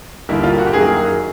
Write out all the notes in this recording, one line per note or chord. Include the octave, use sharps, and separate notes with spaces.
D#2 D3 G3 A#3 E4
F4
F#4
G4
F#2 D#3 F#3 A#3 G#4